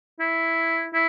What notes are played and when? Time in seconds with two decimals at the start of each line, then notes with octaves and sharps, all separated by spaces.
0.20 E4
0.94 E4